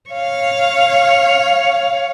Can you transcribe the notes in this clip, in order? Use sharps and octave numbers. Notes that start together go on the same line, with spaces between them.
C#5 F5